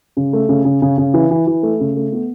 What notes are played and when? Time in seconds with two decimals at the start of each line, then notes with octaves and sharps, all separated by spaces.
0.17 C#3
0.33 A3
0.49 C#3
0.65 C#3
0.82 C#3
0.98 C#3
1.14 E3
1.31 E3
1.47 E3
1.63 A3
1.80 C#3
1.97 A3
2.12 B3